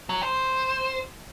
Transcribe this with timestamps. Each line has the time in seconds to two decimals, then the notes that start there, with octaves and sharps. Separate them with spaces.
0.09 F#3
0.23 C5